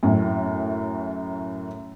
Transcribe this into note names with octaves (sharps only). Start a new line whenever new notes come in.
F#2 A2